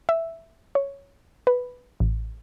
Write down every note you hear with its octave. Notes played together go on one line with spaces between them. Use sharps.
E5
C#5
B4
A1